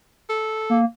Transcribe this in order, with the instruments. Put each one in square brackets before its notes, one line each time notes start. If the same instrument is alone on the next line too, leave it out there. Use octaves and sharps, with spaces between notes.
[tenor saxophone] A4
[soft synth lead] A#3